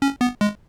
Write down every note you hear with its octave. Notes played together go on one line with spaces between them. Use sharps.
C#4
B3
G#3